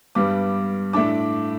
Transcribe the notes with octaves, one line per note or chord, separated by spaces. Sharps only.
G2 G3 B3 D6
A2 A3 D4 D6